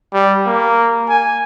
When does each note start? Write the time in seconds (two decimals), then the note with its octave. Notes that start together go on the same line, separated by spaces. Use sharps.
0.14 G3
0.46 A#3
1.09 G#5